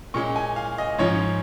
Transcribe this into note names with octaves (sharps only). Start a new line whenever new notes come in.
A#2 G#3 C#4 C#6
G#5
F5
D#5
G#2 F3 C#4 C#5